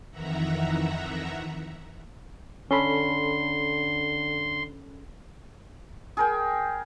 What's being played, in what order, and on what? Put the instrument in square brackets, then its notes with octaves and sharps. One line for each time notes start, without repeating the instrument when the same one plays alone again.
[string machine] F2 D#3 E3 E5 F#5 A#5
[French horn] D3 [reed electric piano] C#4 A4 B5 [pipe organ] C6
[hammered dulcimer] G#4 A#4 G5